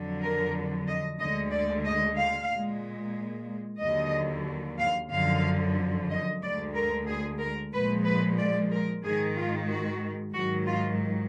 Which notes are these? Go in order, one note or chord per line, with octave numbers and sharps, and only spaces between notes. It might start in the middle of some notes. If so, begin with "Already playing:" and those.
Already playing: F2 D3 F#3
A#4
D#5
D2 D3 G#3 D#5
D5
D#5
F5
A#2 G#3
D#2 D3 F#3 D#5
F5
F#2 D3 F3 F5
D#5
D2 D3 G#3 D5
A#4
G#4
A#4
A#2 F3 G#3 B4
B4
D5
A#4
G#2 D#3 G#3 G#4
F4
F#4
G#2 D#3 F#3 F#4
F4